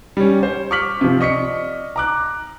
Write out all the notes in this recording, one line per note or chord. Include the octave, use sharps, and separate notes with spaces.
G3 C#4
C5
C#6 D6 F6 B6 F#7
C3 F3
D5 D#5 C#6 B6 C#7
A#5 D6 F#6